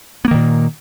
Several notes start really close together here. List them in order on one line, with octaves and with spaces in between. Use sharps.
B3 A#3 D#3 A#2